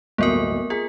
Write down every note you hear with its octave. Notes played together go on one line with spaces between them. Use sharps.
D1 G1 A#3 B3 A#4 D#5
F4 G#4 B6